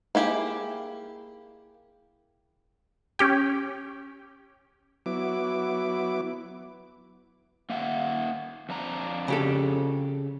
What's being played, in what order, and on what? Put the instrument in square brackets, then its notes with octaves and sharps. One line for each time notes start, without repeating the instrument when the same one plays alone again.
[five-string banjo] A#3 E4 G4 G#4
[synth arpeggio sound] C#4 G4 G5
[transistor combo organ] F#3 B3 E4 D6
[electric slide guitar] A#3 E5 F#5
F2 D4 A#5
[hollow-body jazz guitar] C#3 G4 A4